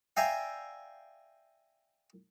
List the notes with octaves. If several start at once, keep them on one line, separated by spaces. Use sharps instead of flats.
D5 E5 F5 G5 G#5 A#5